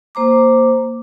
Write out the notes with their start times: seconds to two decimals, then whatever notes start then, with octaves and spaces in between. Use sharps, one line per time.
0.15 A#3 C5 A#5 D6